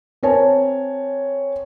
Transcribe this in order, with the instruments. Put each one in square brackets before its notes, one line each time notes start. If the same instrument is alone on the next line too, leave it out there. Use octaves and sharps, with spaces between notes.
[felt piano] C4 A#4 C#5 G#5 A5